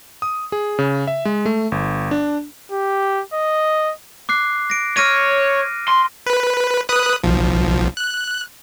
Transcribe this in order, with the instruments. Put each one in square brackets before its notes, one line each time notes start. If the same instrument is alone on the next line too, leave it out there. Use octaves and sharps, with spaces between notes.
[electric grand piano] D#6
G#4
C#3
E5
G#3
A3
G1
D4
[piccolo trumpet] G4
D#5
[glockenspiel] D6 F#6 C7
A#6 D7
[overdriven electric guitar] C#5 [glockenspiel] F6 A#6 D#7
[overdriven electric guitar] C6
[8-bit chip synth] B4
B4 D#6 F#6
B1 F3
F#6